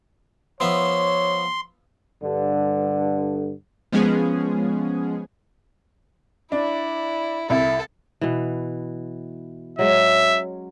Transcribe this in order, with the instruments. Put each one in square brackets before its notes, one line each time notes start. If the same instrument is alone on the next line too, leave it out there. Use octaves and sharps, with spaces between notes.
[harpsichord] F3 B3 E5 [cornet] C#5 [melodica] C6
[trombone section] G2 D3
[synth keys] F3 G#3 B3 C#4 G#4
[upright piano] D4 [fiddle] E4
[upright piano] C2 [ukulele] E4 E5 [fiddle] A4
[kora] B2 E3
[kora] F#3 G#3 C#4 [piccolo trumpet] E5